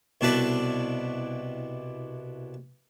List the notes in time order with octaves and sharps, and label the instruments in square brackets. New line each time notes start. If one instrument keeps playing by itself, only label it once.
[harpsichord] C2 B2 D4 E4 B4 D5